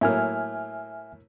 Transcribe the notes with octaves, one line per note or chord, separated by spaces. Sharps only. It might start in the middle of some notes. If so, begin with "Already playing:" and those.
A2 F#3 A#3 E5 G#5 F6